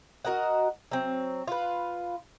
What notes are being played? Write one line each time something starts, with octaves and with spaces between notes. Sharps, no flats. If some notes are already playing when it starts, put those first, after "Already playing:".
F#4 A#4 D#5 F#5
F#3 C4
F4 B4